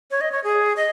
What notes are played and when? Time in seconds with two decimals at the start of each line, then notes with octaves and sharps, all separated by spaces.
0.11 C#5
0.21 D#5
0.32 C#5
0.44 G#4
0.77 D#5